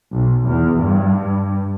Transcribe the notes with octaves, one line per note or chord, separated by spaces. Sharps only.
B1
E2
G2